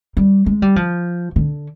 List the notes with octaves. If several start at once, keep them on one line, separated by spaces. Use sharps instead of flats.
G3
G#3
G3
F3
D3